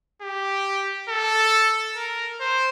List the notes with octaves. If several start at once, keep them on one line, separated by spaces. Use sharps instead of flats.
G4
A4
A#4
C5